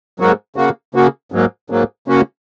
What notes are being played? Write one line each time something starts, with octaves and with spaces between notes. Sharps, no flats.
G#2 F#3 A#3 F#4
C#3 A#3 F#4
C#3 A#3 F#4
G#2 F#3 A#3
G#2 F#3 A#3
C#3 A#3 C#4 F#4